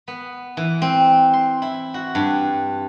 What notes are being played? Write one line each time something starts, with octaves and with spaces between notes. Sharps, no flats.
B3
E3
C4
C6
E4
F#4
G2